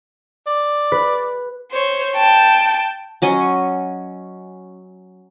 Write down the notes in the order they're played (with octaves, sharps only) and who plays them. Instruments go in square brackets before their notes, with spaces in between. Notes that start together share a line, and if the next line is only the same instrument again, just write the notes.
[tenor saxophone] D5
[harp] B4
[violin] C5 C#5
G5 A5
[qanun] F#3 C#4 D#5